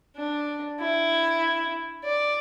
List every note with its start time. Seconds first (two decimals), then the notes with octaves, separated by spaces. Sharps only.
0.17 D4
0.80 E4
2.04 D5